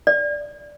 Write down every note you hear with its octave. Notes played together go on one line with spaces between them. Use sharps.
D5